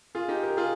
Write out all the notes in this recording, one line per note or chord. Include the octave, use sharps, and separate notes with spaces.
F4 G#4
D#4 G4
G4 A#4
F4 G#4